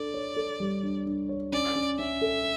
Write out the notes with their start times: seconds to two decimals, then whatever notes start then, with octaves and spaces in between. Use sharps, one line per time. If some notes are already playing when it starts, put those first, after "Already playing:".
Already playing: D4 A4 D5
0.14 C#5
0.36 A4
0.60 G3
0.83 D4
1.06 D4
1.29 C#5
1.52 C#4 D5
1.75 C#4
1.99 C#4 E5
2.21 A4